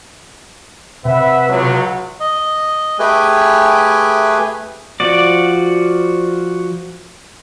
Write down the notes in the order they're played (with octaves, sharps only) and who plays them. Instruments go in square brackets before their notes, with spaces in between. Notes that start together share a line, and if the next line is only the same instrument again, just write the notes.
[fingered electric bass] C3 [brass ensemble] B4 E5 F#5
[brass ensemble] C#2 F#3
[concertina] D#5
A3 G4 G#4 B4 G#5
[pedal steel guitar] F3 F#4 D5